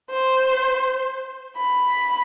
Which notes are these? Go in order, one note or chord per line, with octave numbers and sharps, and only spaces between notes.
C5
B5